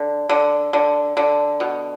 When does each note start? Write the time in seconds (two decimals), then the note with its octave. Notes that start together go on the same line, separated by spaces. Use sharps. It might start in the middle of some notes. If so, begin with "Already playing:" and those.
Already playing: D3
0.29 D3
0.73 D3
1.17 D3
1.60 B2